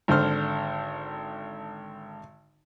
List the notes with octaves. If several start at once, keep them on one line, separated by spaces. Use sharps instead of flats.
G#1 D3 C5 F6